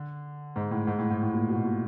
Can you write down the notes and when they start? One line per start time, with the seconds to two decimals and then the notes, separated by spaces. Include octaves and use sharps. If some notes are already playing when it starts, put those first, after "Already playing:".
Already playing: D3
0.56 G#2
0.71 A2
0.87 G#2
0.98 A2
1.10 G#2
1.22 A2
1.34 A#2
1.49 B2
1.65 A#2